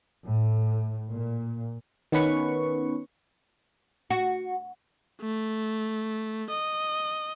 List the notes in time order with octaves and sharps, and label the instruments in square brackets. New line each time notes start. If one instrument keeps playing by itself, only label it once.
[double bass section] A2
A#2
[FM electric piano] D#3 B3 C#4 B4 C#6
[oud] F#4
[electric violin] A3
D#5